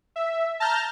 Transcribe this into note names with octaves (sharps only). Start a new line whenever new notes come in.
E5
A5 A#5 F6 G6